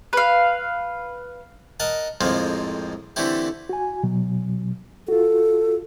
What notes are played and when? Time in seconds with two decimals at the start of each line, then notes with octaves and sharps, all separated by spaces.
0.13 B4 F5
1.80 A#4 D#5 F#5 A5
2.21 F2 A2 F3 G#3 A#3 C4
3.16 D3 E3 A3 C4 E4 G4
3.69 F#4 G#5
4.03 B2 F#3
5.08 F4 F#4 A4